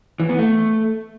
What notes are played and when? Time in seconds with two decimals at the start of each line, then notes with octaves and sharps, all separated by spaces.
0.20 E3
0.29 B3
0.39 A3